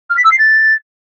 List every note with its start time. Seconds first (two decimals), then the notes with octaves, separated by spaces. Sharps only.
0.10 F6
0.17 B6
0.24 E6
0.31 C7
0.39 A6